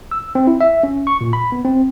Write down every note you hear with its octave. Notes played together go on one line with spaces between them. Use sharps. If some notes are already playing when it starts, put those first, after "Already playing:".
E6
C4
E4
E5
C#4
C#6
A#2
B5
B3
C4